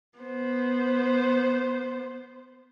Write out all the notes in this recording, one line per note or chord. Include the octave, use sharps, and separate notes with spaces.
B3 C5